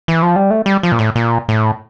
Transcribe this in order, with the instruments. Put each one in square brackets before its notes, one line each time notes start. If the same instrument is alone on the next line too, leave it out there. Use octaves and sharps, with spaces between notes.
[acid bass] E3
F3
G3
A3
G3
F3
A#2
A2
A#2
A2